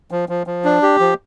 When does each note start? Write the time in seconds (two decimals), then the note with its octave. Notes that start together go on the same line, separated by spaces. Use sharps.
0.11 F3
0.29 F3
0.47 F3
0.65 D4
0.82 G4
1.00 F3